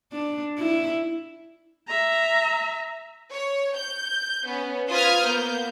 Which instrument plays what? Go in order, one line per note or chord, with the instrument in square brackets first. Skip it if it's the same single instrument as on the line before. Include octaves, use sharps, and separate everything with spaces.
[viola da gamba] D4
E4
[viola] E5 A#5
[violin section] C#5
G6
B3 C#4
F4 B4 C5 D#6 F6 G#6
A#3 B3 G6